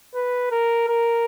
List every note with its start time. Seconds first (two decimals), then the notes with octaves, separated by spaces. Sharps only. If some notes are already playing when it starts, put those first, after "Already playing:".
0.15 B4
0.51 A#4
0.88 A#4